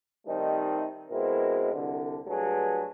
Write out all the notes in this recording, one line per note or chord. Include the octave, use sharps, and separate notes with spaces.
D#3 G3 A3 C4 D#4
B2 G#3 C4 E4 A#4
C2 D3
G2 F#3 A3 G#4 B4